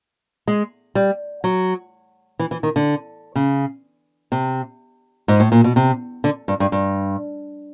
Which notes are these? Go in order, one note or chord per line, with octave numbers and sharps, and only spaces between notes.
G#3
G3
F#3
E3
E3
D#3
D3
C#3
C3
G#2
A2
A#2
B2
C3
D3
G2
G2
G2